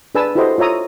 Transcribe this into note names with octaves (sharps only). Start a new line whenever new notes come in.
D4 G#4 B4 G#5 A5 E6
E4 F#4 G4 A4 C5 D#5
F4 C#5 E5 A#5 D#6